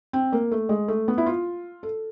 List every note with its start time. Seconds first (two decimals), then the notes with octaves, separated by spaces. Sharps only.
0.13 C4
0.33 A#3
0.52 A3
0.69 G#3
0.88 A3
1.08 B3
1.18 E4
1.26 F4
1.83 A4